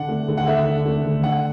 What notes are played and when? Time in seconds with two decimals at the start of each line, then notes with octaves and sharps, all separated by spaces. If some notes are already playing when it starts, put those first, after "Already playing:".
Already playing: D3 D4 F#5
0.09 A3
0.28 D3
0.37 F#5
0.47 D3 E5
0.67 D4
0.85 A3
1.05 D3
1.23 D4 F#5